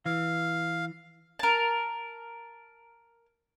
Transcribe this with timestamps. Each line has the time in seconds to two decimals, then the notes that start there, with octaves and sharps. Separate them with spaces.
0.06 E3 F5
1.39 A#4 A5